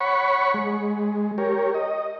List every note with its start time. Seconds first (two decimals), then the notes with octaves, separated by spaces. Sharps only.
0.01 C#5 F#5 B5 C#6
0.54 G#3
1.38 G4 A#4 C#5
1.74 D#5